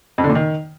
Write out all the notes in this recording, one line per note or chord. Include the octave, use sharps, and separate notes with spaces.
F2
D3
A#2
D#3